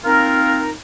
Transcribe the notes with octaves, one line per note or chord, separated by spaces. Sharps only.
A#3 C4 D#4 F4 A#4